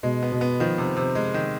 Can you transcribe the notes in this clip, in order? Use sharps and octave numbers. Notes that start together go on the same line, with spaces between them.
B2 G#3
B3
B2
B3
D#3 F3
C3
C3
G#3
D#3